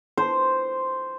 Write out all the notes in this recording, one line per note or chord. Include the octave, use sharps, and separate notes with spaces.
C5